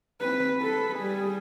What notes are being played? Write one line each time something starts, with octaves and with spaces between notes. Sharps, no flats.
C4 B4
A4 B5
G3 G#4